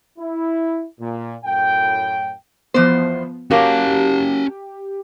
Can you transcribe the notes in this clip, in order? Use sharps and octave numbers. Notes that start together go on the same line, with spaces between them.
E4
A#2
F#2 A2 G5
E2 F3 B3 C5
F#3 A#3 C#4 G4 A5